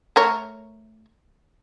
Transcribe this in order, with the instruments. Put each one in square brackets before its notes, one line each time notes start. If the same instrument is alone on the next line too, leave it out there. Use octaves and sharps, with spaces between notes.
[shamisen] A3 A#4 C#5